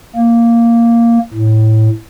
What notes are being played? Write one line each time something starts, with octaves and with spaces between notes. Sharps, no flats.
A#3
A2